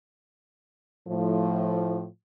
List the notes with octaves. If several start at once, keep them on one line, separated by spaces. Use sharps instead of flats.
A2 F3